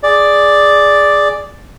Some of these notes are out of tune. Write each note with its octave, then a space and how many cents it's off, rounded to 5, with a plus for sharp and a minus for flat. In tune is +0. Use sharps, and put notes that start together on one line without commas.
G#4 +0 D5 +0